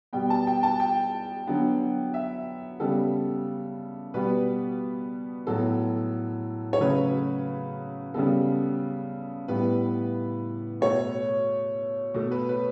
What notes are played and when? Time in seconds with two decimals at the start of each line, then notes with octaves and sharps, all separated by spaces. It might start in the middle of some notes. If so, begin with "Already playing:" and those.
0.13 B2 G3 B3 G5
0.30 A5
0.47 G5
0.63 A5
0.80 G5
1.47 D3 F#3 B3
2.14 E5
2.80 C#3 G3 B3 A4
4.14 B2 G3 B3 B4
5.47 A2 F#3 B3 A4
6.73 C#5
6.80 C#3 F#3 A3 B4
8.14 C#3 G3 B3 A4
9.48 A2 G3 B3 B4
10.81 B2 A3 C#5
12.14 B2 A3
12.31 B4
12.49 B4